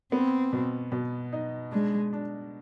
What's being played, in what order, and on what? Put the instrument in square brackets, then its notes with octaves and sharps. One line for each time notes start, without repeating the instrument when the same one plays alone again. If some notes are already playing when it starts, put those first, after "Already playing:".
[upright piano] B3 [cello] C4
[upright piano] B2
B2
D#4
[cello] G#3 [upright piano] D4
[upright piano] D4